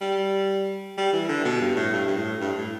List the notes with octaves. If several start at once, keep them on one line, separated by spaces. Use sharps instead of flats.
G3
G3
E3
D3
B2
G2
A2
G2
G2
A2
G2
A2